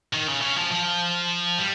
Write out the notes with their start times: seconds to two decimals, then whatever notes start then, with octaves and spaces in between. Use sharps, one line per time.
0.13 D#3
0.28 C#3
0.41 C#3
0.56 F3
0.72 F3
1.58 G3